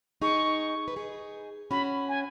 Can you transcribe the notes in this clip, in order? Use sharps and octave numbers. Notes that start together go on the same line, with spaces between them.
D#4 G#4 C#6
B4
D#4 G#4
C#4 F#4 B5
G#5